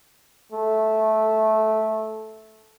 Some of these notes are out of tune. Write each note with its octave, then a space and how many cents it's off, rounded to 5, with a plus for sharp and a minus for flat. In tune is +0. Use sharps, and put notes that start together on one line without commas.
A3 -10